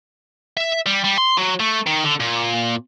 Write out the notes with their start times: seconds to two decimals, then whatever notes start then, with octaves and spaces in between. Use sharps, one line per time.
0.57 E5
0.86 G3
1.04 G3
1.18 C6
1.38 F#3
1.60 A3
1.87 D#3
2.04 D3
2.20 A#2